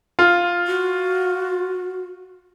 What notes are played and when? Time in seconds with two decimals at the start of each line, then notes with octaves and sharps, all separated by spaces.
0.19 F4
0.67 F#4